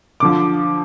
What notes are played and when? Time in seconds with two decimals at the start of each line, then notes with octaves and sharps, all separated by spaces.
0.20 D3 F3 D6